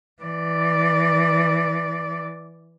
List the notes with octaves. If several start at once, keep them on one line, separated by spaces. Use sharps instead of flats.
E3 D5